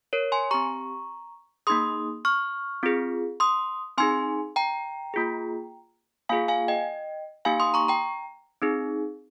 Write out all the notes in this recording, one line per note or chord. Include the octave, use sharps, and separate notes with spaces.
A#4 C#5
G#5 C6
C4 G4 A#5 C#6
A#3 D#4 G#4 C6 D#6
C#6 F6
C4 F4 G#4
C6 D#6
C4 D#4 G#4 G#5 C6
G5 A#5
A#3 F4 G#4
A#3 F4 G#4 F5 G#5
F5 G#5
D#5 G5
A#3 D#4 G4 F5 G#5
C6 D#6
A#5 C#6
G5 A#5
C4 D#4 G#4